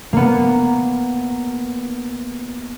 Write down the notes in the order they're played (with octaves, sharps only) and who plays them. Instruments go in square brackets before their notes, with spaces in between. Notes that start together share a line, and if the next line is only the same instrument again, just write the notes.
[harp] A#3 B3